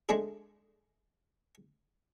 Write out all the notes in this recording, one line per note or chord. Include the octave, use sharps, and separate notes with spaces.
G#3 A3 D4 G#4